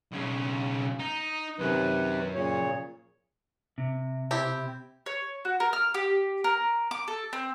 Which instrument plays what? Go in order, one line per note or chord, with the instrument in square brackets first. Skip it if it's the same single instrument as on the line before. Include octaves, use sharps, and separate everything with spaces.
[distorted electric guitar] B1 C#3
D#4
[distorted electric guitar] F#2 [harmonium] C3 D#3 B4
[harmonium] A#2 C#3 C#5
[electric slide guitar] C3
[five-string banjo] C4 E4 G4
[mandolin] C#5
F#4
A#4
F6
G4
A#4
D6
A4
C4